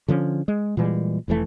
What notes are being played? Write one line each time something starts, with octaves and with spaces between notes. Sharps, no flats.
D3 F3 G#3 C#4
G#3
A#2 E3 G3 G#3
F1 F2 E3 A3